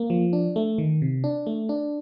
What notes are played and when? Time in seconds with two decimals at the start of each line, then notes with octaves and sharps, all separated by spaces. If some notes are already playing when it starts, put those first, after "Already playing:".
Already playing: A#3
0.10 F3
0.33 D4
0.56 A3
0.78 D#3
1.02 C3
1.24 D4
1.47 A3
1.69 D4